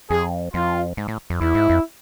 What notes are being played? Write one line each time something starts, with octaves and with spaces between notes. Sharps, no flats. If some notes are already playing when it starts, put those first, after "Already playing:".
F2 G#4
F2 F4
G#2
A2
F2
E2 E4
G#2
F2